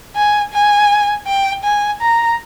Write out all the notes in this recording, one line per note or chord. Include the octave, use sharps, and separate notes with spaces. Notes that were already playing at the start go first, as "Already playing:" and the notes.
G#5
G#5
G5
G#5
A#5